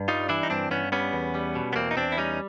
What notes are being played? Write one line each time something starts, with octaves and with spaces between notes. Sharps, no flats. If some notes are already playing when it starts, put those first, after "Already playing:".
Already playing: G2
G3 D#4 F4
E3 D4 E4
D#4
G2 C4 D4
G2 B3 C#4
G3 B3 C#4
E2
G3
B2
B3
E2 A#3 C4
D#4
E2 C4 D4
E4
G3 C#4 D#4